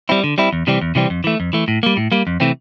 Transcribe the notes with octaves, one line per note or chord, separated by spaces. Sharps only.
G3 C4 E4
D3
G3 C4 E4
E2
C3 E3 G3 C4
E2
C3 E3 G3 C4
F2
E3 A3
F2
E3 A3
A2
G3 A#3
A2
G3 A#3
F2
C3 E3 A3 C4